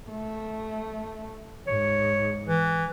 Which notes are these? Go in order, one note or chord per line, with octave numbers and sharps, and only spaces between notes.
A3
G#2 C#5
E3